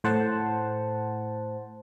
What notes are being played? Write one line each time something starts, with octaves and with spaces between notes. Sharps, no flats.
A2 C5 F#5 A5